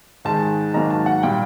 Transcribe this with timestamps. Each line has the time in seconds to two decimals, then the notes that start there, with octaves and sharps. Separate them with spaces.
0.25 G#2 D#3 G#3 A5
0.74 G#2 D#3 F#3 A#3 A#5
0.90 A5
1.06 F#5
1.23 A#2 G3 G5